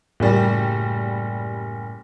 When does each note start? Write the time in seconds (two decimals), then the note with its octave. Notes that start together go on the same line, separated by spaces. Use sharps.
0.20 F#1 A2 G3